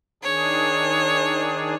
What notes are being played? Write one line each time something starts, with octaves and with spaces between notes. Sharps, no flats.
D#3 D4 G#4 C#5